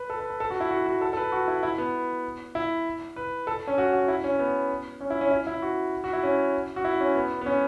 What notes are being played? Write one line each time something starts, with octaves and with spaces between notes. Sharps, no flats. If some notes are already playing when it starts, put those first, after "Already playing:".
Already playing: B4
A4
B4
B4
A4
F#4
E4
F#4
F#4
A4
A4
B4
F#4
E4
E4
B3
E4
B4
A4
C#4
F#4
F#4
E4
C#4
B3
C#4
E4
C#4
E4
E4
F#4
F#4
E4
C#4
F#4
E4
C#4
B3
B3
C#4